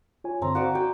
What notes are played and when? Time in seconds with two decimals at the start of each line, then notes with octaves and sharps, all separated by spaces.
0.24 F4 C#5 G#5
0.42 G2 D3 C4 A#5
0.55 F#4 C5 D5 F5 C#6
0.75 F#4 G5